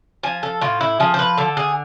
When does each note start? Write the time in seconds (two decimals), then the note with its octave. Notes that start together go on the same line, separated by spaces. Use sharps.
0.23 F3 G#5
0.43 A4
0.61 A2 F4
0.81 E4
1.00 F3 G#4
1.14 C5
1.19 B4
1.37 D3 A4
1.57 G#4